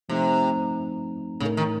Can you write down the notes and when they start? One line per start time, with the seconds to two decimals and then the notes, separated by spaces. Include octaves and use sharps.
0.09 C3 F3 A3 C4 D#4
1.40 A2 C#3 A3 D#4 A#4
1.57 D#3